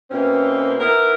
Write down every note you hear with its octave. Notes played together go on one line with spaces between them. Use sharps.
B2 E3 A#3 C4 C#4
B3 D#4 E4 A#4